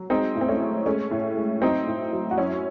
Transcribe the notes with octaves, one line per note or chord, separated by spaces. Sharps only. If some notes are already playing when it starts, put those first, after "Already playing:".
Already playing: F#3
G#3 C4 D#4
A2
C4
A3 C#4
G#3
G#3 A3 C#4
A2
G#3
F#3 C4 D#4
A2
F#3
F#4
F#2 C#4 E4